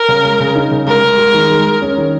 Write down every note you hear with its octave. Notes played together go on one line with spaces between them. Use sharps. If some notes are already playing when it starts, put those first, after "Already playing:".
Already playing: A#4
C#3
G#3
C#3
D#4
C#3
G#3 A#4
G#3
G#3
D#3
G#3
G#3
C#4
D#3